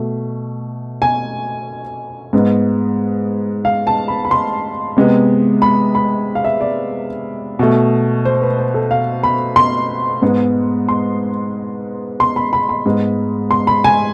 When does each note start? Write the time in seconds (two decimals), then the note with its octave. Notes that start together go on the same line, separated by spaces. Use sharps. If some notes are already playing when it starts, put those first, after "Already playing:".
Already playing: B2 A3
1.02 G#5
2.33 G#2 G#3 B3
3.65 F5
3.87 A5
4.08 B5
4.25 B5
4.31 C6
4.96 C3 G#3 B3
5.62 B5
5.95 B5
6.35 F5
6.45 E5
6.61 D5
7.59 B2 A3
8.25 C5
8.42 B4
8.58 C5
8.74 A4
8.91 F5
9.23 B5
9.56 C6
10.22 G#2 G#3 B3
10.89 C6
12.20 C6
12.36 B5
12.53 B5
12.69 B5
12.85 G#2 G#3 B3
13.51 C6
13.67 B5
13.84 G#5